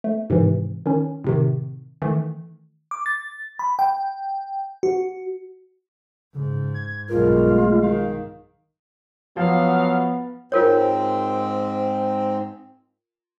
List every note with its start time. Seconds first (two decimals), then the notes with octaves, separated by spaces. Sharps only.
0.04 A3
0.30 G#2 C3 D#3 E3
0.86 D#3 C#4
1.24 A2 C3 D#3
2.02 D#3 E3 A3
2.91 D6
3.06 A6
3.59 B5
3.79 G5
4.83 F#4
6.35 G#2 C#3
6.74 G#6
7.09 B1 G2 G#3 F4 A#4
7.51 A3
7.82 D#3 F5
9.37 F3 F#3 B3 F5
10.52 G#2 C4 F4 A#4 C#5